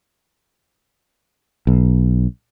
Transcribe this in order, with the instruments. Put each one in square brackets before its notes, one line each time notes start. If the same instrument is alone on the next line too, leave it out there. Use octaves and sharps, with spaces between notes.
[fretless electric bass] B1